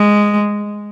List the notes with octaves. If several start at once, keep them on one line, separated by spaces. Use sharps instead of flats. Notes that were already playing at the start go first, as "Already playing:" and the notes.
Already playing: G#3